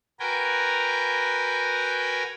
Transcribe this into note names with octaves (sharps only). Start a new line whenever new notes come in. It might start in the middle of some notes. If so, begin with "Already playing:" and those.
F#4 A#4 B4 G5 G#5 A#5